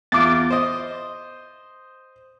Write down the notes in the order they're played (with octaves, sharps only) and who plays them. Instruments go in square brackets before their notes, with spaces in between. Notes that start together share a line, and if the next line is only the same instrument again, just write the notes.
[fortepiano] E2 F4 [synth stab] D6 A6
[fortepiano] C5 D#5